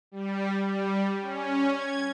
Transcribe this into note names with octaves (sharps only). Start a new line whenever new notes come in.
G3
G3
C#4
G#6